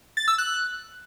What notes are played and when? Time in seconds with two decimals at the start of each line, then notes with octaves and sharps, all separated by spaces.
0.17 A6
0.28 E6
0.38 F#6